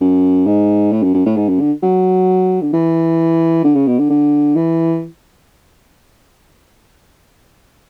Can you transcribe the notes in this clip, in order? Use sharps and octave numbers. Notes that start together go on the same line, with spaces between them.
F#2
G#2
A2
F#2
F#2
A2
G#2
F#2
D3
F#3
D3
E3
D3
C#3
B2
D3
D3
E3